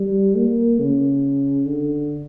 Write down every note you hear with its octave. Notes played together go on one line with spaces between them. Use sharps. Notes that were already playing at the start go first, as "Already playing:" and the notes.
Already playing: G3
A#3
C#3
D3